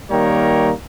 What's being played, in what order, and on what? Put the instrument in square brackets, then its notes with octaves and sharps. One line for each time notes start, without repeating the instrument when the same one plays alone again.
[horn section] D#3 G3 A#3 C#5 G5 A#5